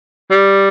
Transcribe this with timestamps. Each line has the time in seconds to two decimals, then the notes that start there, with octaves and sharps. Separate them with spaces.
0.31 G3